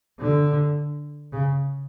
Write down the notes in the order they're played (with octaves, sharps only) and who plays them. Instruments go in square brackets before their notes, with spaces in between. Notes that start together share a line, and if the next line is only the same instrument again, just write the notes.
[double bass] D3
C#3